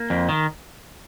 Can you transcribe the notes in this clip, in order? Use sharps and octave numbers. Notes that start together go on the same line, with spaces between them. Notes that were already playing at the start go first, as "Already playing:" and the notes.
Already playing: A#3
F2
D#3